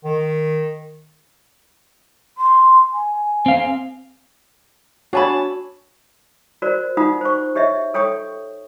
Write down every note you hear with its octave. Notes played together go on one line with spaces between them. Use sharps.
D#3
C6
G#5
C4 F5
D4 F#4 C#5 G#5 A5 B5
F#4 A#4 C5 D5
D#4 F4 F#5 D#6
C5 C#6
G4 C#5 D#5 E5
A4 C#5 G5 C#6 D#6